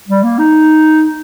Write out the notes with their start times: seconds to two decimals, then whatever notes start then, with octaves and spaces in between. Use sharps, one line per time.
0.09 G3
0.24 A#3
0.39 D#4